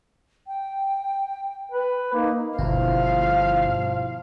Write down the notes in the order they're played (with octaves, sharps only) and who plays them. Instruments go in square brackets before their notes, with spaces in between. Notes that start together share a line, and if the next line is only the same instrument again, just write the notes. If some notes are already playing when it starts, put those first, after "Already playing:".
[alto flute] G5
[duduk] B4
[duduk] A#3 [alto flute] D#4
[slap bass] G1 [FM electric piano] B2 E4 [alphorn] F3 [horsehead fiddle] F5